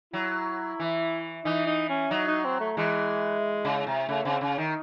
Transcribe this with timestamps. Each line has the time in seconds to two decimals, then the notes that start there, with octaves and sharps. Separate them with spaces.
0.13 F#3 E4
0.80 E3
1.45 E3 D#4
1.67 D#4
1.89 C#4
2.11 F#3 D#4
2.27 D#4
2.44 C4
2.60 A3
2.77 E3 G#3
3.65 C#3
3.87 C3
4.08 C#3 A3
4.25 C#3 C4
4.41 C#3 C#4
4.58 D#3 D#4